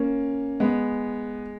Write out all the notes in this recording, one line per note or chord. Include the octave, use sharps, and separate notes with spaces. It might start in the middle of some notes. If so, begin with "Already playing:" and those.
Already playing: A#3 C#4
G#3 B3